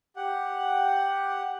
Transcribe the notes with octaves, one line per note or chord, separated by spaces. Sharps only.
G4 F#5